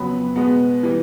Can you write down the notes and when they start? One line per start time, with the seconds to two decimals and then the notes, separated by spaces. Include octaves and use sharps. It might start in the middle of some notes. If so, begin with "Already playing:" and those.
Already playing: F2 C#3 F#3 B3 B5
0.36 B2 G#3 B3
0.83 E3 G3